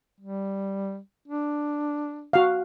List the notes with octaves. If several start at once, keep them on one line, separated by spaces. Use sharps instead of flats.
G3
D4
F#4 F5